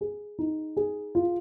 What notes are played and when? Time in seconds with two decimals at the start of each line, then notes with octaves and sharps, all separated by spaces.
0.01 G#4
0.39 D#4
0.77 G#4
1.15 F4